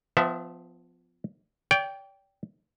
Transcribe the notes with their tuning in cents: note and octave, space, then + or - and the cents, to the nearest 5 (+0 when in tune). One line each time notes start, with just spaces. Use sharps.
F3 +0 B3 +35 E5 +0
D5 -45 G5 +0